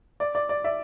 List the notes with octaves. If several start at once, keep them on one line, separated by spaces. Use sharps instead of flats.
D5
D5
D5
D5 E5